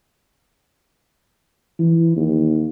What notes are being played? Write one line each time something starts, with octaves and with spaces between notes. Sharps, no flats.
E3
D#2